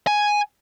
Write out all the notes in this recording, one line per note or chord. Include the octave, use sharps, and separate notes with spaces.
G#5